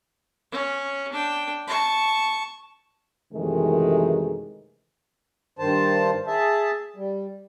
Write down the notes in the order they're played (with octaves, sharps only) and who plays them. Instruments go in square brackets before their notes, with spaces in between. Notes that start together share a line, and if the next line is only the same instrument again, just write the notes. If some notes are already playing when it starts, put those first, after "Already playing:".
[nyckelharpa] C#4
D4 G5
A5 C#6
[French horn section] F#2 C3 D#3 E3 G#3 A3
[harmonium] G2 D#3 C5 A5
G#4 E5 A5
G3